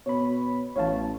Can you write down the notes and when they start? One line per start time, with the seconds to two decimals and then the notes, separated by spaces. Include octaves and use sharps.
0.06 B2 C#5 B5
0.76 A1 C#5 F5 A5